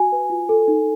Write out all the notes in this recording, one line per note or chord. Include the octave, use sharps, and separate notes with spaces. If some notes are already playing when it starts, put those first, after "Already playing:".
Already playing: F#4 G#5
B4
F4
A4
D#4